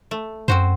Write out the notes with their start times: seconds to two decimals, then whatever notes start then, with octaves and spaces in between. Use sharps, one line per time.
0.11 A3
0.48 F#2 C4 F#4 C5